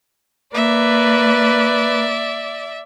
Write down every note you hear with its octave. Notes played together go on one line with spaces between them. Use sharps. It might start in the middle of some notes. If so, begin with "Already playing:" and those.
A#3 B4 D5 E5